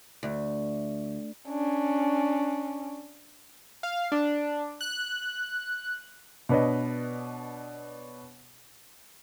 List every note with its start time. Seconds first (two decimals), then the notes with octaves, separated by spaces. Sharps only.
0.23 D2
1.49 C#4 D4
3.83 F5
4.12 D4
4.81 F#6
6.49 B2 D4 B4 C#5 D#5